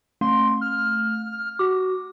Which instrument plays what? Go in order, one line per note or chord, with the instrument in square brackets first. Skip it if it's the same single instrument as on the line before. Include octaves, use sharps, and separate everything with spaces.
[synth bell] A3 [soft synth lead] C6
[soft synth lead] F6
[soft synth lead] F#4 [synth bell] D6